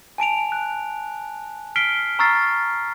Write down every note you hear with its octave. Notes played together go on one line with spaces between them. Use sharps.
G#5 A5 D7 F7
F#6
F6 B6 C7 D7 G7
A#5 C#6 E6 F6 A6 C7